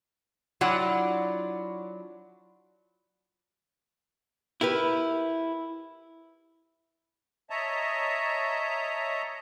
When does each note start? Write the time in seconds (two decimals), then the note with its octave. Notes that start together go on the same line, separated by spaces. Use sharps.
0.61 F#3 D4 E4 F4 F#5
4.61 E4 G4 A#4 B4
7.50 C#5 D#5 E5 A5 A#5